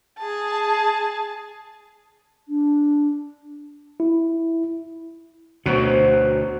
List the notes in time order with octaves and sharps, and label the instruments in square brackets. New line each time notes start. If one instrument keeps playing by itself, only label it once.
[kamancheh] G#4 A5
[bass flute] D4
[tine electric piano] E4
[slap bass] D2 B2 [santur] F#3 F#4 C5